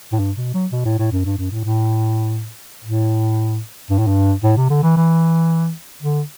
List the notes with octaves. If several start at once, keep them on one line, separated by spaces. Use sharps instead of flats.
A2
G2
B2
F#3
B2
A2
A2
F#2
G2
F#2
A2
A2
A2
G2
A2
G2
A2
C3
D3
E3
E3
D3